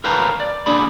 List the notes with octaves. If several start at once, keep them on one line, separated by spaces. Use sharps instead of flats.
A#4 B4 F5 G5 A5 A#5
D5
A#3 D4 G#4 B5